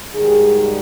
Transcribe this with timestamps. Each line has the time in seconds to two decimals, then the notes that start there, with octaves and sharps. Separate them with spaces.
0.15 G#2 D#3 G3 G#4